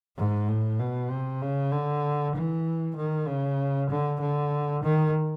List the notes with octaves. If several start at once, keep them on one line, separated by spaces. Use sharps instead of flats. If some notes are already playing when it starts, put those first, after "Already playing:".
G#2
A2
B2
C3
C#3
D3
E3
D#3
C#3
D3
D3
D#3